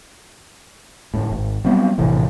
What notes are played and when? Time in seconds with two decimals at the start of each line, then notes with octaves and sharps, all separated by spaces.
1.14 G1 A2
1.31 G#1
1.64 F#3 G3 B3 C4
1.98 A#1 A2 C3 E3